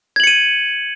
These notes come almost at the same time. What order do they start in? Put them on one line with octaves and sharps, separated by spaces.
G#6 F#7 C#7 D#7